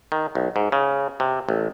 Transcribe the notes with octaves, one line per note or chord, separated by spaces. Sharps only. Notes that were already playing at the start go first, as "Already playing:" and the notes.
D#3
B1
G#2
C#3
C3
A1